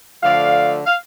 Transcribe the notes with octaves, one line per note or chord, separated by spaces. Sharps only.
D3 F3 A3 D5 F5
F5